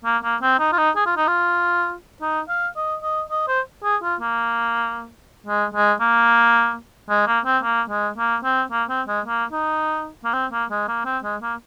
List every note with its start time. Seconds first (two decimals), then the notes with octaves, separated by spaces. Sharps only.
0.05 A#3
0.24 A#3
0.42 C4
0.59 D#4
0.72 F4
0.78 D#4
0.96 G#4
1.06 F4
1.17 D#4
1.27 F4
2.21 D#4
2.49 F5
2.76 D#5
3.03 D#5
3.30 D#5
3.48 C5
3.84 G#4
4.03 F4
4.20 A#3
5.46 G#3
5.74 G#3
6.00 A#3
7.09 G#3
7.27 A#3
7.45 C4
7.63 A#3
7.90 G#3
8.18 A#3
8.44 C4
8.71 A#3
8.89 C4
9.08 G#3
9.26 A#3
9.52 D#4
10.24 A#3
10.33 C4
10.52 A#3
10.70 G#3
10.88 A#3
11.05 C4
11.24 G#3
11.42 A#3